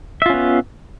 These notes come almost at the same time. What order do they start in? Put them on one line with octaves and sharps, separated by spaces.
E5 F4 C#4 B3